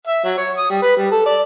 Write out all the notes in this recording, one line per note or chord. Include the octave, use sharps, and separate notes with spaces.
E5
F#3
C#5
D#6
G3
B4
G3
A4
D5